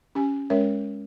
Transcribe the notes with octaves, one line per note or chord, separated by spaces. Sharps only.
C#4 G4 G#5
G#3 C#4 A#4 C#5 E5